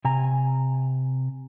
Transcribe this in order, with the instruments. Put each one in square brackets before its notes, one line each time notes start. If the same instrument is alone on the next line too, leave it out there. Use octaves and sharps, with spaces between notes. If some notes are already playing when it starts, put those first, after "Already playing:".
[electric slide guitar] C3 G#5 A#5